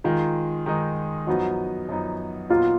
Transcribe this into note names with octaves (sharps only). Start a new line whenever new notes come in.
D#3 G#3 D#4 F4
D#3 G#3 D#4
F#2 F3 B3 D#4 F#4
F#2 F3 B3 D#4
A#2 F#3 B3 D#4 F4